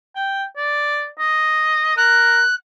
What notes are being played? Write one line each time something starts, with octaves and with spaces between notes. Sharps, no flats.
G5
D5
D#5
A#4 F#6